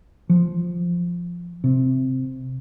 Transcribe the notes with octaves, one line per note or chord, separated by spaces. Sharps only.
F3
C3